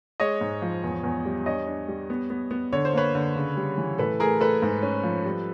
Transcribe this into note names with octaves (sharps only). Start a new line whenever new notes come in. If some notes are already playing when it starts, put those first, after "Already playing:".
G#3 C#5 D#5
G#2
F3
E2
E2
G3
D4 C#5 D#5
D4
G3
B3
B3
B3
D3 C#5
C5
A#3 B4 C#5
D3
C#3
G3
E3
A2 A4 B4
A3 G#4 A#4
A3 A4 B4
G#2
C#4
F3
G3